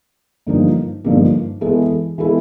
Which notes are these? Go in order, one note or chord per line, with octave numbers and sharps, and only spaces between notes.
G2 D3 F3 A#3 D#4
G2 D3 F3 A#3 D#4
E3 G#3 B3 E4 A4
E3 G#3 B3 E4 A4